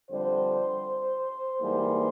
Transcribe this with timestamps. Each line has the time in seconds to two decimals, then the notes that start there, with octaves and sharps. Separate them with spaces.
0.10 F2 D3 G3 C5
1.61 G#2 E3 G3 A#3